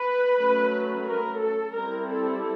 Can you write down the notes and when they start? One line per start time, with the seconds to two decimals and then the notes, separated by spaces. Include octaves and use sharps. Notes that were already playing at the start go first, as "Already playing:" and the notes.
Already playing: B4
0.37 F#3 A3 C#4
1.06 A#4
1.40 A4
1.74 G3 C4 E4 A#4
2.09 A4